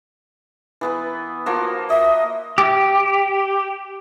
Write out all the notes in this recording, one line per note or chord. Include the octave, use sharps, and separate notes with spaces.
E3 B3 B4
F3 A#3 F#4
D#5 E5
G4